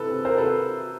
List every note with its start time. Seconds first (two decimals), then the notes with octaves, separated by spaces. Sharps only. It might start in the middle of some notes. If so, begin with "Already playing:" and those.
Already playing: C3 E3 A4 B4
0.11 C3
0.25 A#4 C5
0.38 C3 A4 B4